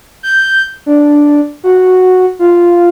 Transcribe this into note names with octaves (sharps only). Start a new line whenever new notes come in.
G6
D4
F#4
F4